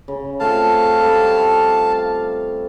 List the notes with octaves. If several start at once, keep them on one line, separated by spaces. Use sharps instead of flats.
C#3
A3 C4 F4 F5 A5
G3 A3 A#5